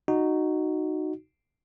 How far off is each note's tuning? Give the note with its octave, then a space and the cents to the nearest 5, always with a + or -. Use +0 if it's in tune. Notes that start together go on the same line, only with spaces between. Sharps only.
D#4 -10 F#4 +0